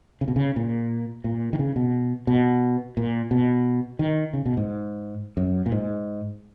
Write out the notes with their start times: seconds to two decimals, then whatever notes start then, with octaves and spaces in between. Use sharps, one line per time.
0.21 C#3
0.28 B2
0.36 C#3
0.56 A#2
1.24 A#2
1.53 D#3
1.59 C#3
1.76 B2
2.27 B2
2.97 A#2
3.31 B2
3.99 D#3
4.33 C#3
4.46 B2
4.57 G#2
5.37 F#2
5.66 A#2
5.72 G#2